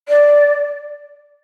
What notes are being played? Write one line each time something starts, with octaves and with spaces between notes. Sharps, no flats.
D5